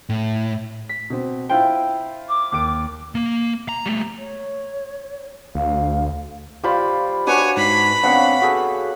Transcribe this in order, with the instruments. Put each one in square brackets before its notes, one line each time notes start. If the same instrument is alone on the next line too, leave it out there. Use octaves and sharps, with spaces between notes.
[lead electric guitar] A2
[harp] B6
[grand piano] B2 C4
[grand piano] E4 F4 C5 [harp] G5
[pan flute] D6
[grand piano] D#2 D7
[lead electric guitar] A#3
A#5
G3 A3
[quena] C#5
[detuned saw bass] D2 [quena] F5
[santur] F4 B5 [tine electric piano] G4 C5 D5
[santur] D4 F#4 B4 [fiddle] C#5 G#5
[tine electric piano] G#2 C7 [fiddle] B5
[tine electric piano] B3 C4 D4 [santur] C#5 F5 F#5
[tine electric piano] F#4 G#4 A4